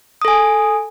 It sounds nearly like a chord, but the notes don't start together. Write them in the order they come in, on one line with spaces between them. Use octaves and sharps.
D#6 A4 G#5